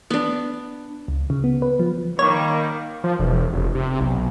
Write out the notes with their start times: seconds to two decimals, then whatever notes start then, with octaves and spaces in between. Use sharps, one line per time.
0.10 B3 D4
1.08 C#2
1.30 C#3
1.44 B3
1.62 B4
1.79 F3
2.19 D#3 G3 A#3 C#5
3.04 F3
3.19 E1
3.53 F1
3.75 C3
4.00 B1